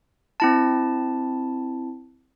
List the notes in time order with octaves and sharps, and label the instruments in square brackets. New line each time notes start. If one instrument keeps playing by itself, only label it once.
[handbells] C4 E4 A5